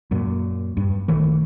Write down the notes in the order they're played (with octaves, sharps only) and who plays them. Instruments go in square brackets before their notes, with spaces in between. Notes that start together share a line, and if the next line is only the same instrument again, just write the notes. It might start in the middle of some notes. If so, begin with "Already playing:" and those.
[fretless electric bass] F#2 A#2
G2
A#1 D#3 E3 A3